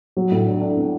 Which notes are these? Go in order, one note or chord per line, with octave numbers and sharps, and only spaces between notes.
F#3
A2
D4
D4
B3